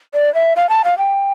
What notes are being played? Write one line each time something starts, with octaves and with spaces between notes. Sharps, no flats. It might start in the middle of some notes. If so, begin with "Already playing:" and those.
D5
E5
F5
A5
F5
G5